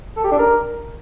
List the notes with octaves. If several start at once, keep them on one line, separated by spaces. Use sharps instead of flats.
A4
G4
D4
A#4